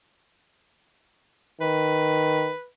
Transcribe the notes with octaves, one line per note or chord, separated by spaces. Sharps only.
D#3 B4